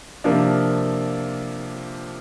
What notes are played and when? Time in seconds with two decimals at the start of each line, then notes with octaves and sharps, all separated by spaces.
0.24 C3 F3 A#3 D4